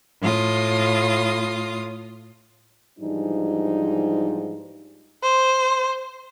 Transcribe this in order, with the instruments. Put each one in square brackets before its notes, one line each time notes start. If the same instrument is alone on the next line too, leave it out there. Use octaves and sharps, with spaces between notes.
[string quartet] A2 F4 D#6
[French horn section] G#2 E3 F3 G3 D4 D#4
[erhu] C5